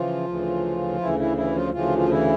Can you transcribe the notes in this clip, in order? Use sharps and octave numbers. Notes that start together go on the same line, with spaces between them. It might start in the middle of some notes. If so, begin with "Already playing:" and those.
Already playing: C#3 E3 F3 F4
D2 C#3 E3
D2 C#3 E3 E4
E3 E4
E3 E4
F3 F4
D2 C#3 E3 F3 F4
F4
E3 E4